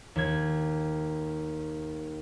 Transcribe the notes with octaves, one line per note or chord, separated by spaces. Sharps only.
D#2 G#6